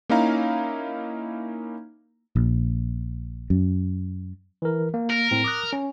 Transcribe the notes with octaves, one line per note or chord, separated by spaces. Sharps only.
A#3 C#4 D#4 E4 F5 A#5
A#1
F#2
E3 A#4
A#3
A#4
A2 C4
D6 D#6 F#6
C#4